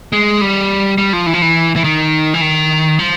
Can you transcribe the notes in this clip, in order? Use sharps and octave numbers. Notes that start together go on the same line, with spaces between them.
G#3
G3
G3
F3
E3
F3
E3
E3
D#3
E3
D#3
F3